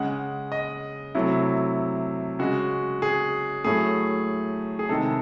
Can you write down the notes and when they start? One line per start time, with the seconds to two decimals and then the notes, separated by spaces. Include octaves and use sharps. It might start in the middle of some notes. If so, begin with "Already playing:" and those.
Already playing: C#3 G#3 F#5
0.52 D#5
1.15 C3 F#3 A3 E4
2.39 C#3 G#3 F#4
3.02 G#4
3.64 A2 F#3 A3 G#4
4.79 G#4
4.89 C3 D#3 G#3 A4